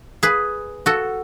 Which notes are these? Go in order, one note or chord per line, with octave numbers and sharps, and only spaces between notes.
G#4 B4
F#4 A4